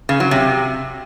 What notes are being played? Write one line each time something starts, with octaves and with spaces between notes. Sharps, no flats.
C#3
F#3
C3